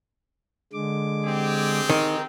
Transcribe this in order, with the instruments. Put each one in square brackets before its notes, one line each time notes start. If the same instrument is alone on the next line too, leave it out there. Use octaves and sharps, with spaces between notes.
[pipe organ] D3 G#3 D6
[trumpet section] C4 G4 G#4
[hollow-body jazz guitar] D#3 [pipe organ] A#4